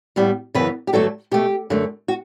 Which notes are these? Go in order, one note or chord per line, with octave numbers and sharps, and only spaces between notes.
A2 G3 B3
F#2 C#3 E3 B3 B4
G4
G2 D3 F#3 A3 A4
B2 A3 G4
F#2 D3 A3
F#4